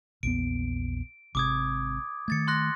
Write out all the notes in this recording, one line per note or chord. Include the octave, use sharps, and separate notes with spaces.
A#1 E2 B3 D7
G#1 G#2 C3 D6 D#6 G#6
D#3 A3 G#6 A6 C#7
C6 F#6 A#6